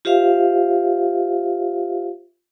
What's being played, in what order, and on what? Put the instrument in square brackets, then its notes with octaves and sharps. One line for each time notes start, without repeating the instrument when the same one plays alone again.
[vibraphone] F4 G4 C5 E5 F5